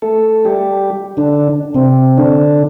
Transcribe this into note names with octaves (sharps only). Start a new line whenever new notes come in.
A3 A4
G3 G4
D3 D4
C3 C4
D3 D4